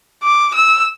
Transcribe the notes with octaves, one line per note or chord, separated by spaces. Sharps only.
D6
E6